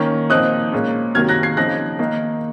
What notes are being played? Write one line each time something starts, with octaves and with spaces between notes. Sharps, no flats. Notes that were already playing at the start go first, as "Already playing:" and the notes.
Already playing: D#3 A#3 C#4
A#2 F3 C4 D#4 D#6 F#6
A#2 G#3 C#4
C3 D#3 F#3 A#3 F6 G#6
F#6 A#6
G#6 C7
C#3 F3 C4 D#4 F#6 A#6
D#3 A#3 D#4